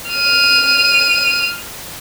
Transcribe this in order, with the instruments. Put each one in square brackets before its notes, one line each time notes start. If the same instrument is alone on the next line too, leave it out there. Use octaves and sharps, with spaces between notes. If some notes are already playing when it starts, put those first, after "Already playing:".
[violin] F6 D#7